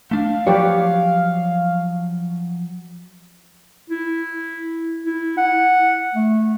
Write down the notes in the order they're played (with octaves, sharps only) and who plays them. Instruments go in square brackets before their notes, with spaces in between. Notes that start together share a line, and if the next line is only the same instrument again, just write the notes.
[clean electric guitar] A3 D4 [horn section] F5
[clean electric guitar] F3 F#3 C#5 [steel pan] G4 B4 D5
[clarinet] E4
E4
F#5
A3